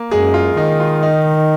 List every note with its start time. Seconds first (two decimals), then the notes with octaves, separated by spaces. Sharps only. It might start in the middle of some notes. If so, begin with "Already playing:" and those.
Already playing: A#3
0.11 F#2 G#3 G#4
0.34 F4
0.57 D#3 D#4
0.80 F4
1.03 D#4